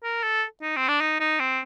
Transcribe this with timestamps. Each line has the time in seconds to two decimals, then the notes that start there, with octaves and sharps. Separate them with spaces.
0.04 A#4
0.23 A4
0.62 D#4
0.77 C4
0.88 D4
1.01 D#4
1.20 D#4
1.40 C4